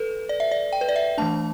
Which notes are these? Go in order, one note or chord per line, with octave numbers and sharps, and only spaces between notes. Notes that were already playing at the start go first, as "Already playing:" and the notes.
Already playing: A4 B4
D5
E5
D5
G5
B4
D5
E5
E3 A3 D4 A5